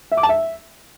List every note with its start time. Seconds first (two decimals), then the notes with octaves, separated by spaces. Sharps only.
0.12 E5
0.17 D6
0.23 A5
0.29 E5